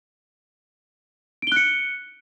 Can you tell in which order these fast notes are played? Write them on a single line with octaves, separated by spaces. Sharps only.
D7 G7 F#6 C#7